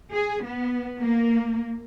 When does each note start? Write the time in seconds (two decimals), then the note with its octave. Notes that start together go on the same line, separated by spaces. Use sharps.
0.12 G#4
0.45 B3
1.01 A#3